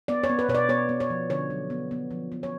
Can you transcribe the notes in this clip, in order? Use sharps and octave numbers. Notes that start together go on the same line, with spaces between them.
B3 D5
C#5
B3
B4
B2 C#5
D5
B3 C#5
B3
C#5
F3
D3 C#5
F#3
B3
B3
F3
B3
C#5